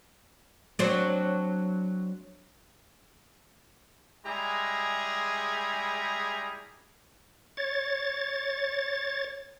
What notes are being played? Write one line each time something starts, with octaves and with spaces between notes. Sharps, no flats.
F#3 C4 D4
G3 G#3 E4 G#4 A#5
C#5 A6